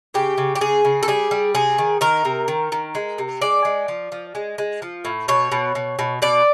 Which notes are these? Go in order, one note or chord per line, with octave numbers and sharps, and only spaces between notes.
C#3 G4
C#3
G4
C#3 G#4
C#3
A4
G3 G#4
G3
C3 G#4
D#3
D#3 A#4
C3
D#3
D#3
G#3
C3
G#3 D5
G#3
F3
F3
G#3
G#3
F3
A2
B2 C#5
B2
B2
B2
B2 D5